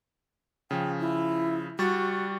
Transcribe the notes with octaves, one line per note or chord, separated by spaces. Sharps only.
C#3 F3 G5
E4
G3 F#4 C#6 A6